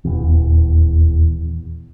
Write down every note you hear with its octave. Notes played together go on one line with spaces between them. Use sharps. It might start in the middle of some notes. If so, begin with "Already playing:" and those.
D#1 E2